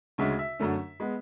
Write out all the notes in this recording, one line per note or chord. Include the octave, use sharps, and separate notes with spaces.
D2 C#3 G#3 C#4 E5
E5
F#2 D3 A3 C#4
G#3 B3